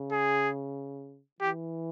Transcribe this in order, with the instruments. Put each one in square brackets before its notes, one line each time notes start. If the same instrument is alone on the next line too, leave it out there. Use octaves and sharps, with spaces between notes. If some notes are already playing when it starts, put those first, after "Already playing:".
Already playing: [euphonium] C#3
[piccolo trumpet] G#4
[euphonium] E3 [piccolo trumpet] G4